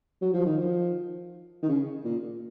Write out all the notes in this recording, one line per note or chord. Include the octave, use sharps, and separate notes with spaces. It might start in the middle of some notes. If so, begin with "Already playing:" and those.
F#3
F3
D#3
F3
D#3
C#3
A#2